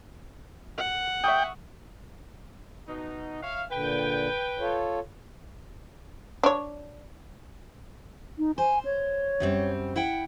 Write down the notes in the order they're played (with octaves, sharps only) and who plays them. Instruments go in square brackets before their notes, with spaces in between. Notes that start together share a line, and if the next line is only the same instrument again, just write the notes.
[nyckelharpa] F#5
[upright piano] E5 C#6 D#6 [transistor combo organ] G5
[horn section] B2 D#4
C#5 E5 F5
[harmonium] A#2 D3 [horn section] B4 G5
[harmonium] F4 A4 C#5
[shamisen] D4 C#5
[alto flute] D#4
[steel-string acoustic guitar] C5 [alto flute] G#5
[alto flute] C#5
[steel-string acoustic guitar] F#2 G3 C4
E4 F#5 G5